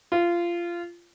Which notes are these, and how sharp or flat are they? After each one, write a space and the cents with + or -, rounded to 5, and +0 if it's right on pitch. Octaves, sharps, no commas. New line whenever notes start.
F4 -20